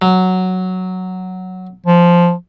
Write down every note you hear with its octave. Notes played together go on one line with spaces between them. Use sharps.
F#3
F3